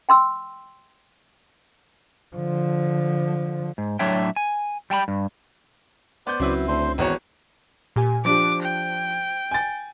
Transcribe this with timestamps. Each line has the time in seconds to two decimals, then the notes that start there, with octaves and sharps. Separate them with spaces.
0.09 G5 C6 E6
2.36 D3 F3
3.78 G#2
3.99 A2 F#3 D4 C#5 E5 G5
4.36 G#5
4.90 G3 G5 A5 B5
5.08 G2
6.27 B3 C5 D5 G6
6.40 C#2 F#3 C4 C#4 E4 B4 E5
6.68 D2 C5 C6
6.98 G#1 E2 D#4 F#4 C#5
7.96 A#2 G4 G#5
8.25 F3 D4 G4 C5 D6 F#6
8.62 G5
9.51 G#5 A6